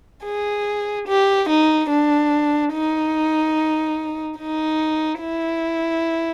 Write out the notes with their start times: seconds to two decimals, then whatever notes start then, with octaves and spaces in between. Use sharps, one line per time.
0.25 G#4
1.08 G4
1.49 D#4
1.90 D4
2.73 D#4
4.38 D#4
5.21 E4